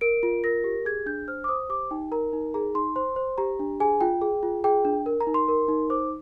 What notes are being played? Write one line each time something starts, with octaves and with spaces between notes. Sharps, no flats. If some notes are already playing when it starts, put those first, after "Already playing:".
A#4 D7
F4
A#4 A#6
G4
G#4 G#6
D4 G6
C5 F6
D6
C5 D#6
G4 D6
D#4 G5
A#4 A#5
D#4
G#4 A#5
D#4 C6
C5 C6
C5
G4 A#5
D4
G#4 G#5
F4 G5
G#4
F4
G#4 G5
D4
A#4
A#5
D#4
C6
A#4
D#4
C5 D6